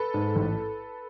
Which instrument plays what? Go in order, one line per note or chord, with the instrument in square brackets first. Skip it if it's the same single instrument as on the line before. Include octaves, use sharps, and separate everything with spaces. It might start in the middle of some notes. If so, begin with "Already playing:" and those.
Already playing: [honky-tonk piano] A4 B4
[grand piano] G#2
A1